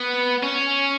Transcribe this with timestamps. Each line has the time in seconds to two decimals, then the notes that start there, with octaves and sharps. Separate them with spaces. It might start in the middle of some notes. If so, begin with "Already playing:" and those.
Already playing: B3
0.43 C#4